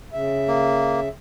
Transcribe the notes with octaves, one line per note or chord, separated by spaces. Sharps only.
C#3 E5
A#3